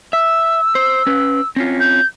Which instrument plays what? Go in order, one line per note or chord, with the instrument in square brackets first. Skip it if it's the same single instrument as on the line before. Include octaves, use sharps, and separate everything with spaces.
[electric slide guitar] E5 [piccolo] E6
[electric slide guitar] C5
C#4 B4
C4 C#4 F4
[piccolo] G6